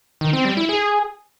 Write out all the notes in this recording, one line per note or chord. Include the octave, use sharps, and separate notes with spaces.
D#3
C4
G3
E4
G#4